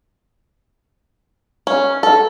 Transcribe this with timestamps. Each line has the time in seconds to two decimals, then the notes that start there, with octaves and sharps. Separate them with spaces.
1.67 C#4
2.03 A4